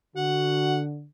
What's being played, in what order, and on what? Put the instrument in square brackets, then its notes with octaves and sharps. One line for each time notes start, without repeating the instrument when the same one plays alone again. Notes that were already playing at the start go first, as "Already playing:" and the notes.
[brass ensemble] D3 [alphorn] F#4 [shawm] F#5